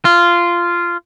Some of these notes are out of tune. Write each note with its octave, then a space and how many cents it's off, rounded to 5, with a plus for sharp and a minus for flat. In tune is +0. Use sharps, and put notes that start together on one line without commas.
F4 -10